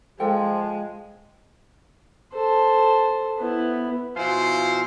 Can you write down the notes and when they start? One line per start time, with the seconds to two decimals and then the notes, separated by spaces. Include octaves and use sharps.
0.20 F3 G#3 A4 G5
2.34 A4 C5
3.38 B3 E4
4.17 B2 F3 E4 F4 C5 G#5